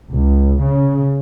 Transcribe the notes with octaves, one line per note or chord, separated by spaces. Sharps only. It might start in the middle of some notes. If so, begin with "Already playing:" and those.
C#2
C#3